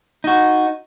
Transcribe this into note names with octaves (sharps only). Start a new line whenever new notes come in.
D#4 F#4